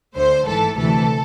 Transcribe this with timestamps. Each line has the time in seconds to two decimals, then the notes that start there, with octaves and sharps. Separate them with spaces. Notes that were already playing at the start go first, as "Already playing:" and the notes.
0.15 D2 D3 A3 C5
0.46 G#1 G#2 E3 A3 A4
0.76 D2 C3 E3 A3 A4